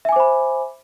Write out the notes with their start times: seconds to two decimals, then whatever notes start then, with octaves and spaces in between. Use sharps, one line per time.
0.05 E5
0.09 G#5
0.12 D6
0.16 C5
0.20 B5